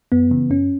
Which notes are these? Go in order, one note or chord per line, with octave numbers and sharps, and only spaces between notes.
F#2 B3
C#3 E3
F#2 C#4